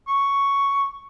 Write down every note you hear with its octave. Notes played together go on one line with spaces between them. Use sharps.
C#6